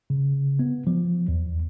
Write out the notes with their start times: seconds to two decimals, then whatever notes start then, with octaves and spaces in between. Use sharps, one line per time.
0.10 C#3
0.59 B3
0.87 F3
1.28 E2